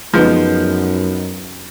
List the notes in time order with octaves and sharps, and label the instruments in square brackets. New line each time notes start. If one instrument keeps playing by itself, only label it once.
[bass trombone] F#2 [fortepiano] F3 [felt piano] G#3 B3 D#4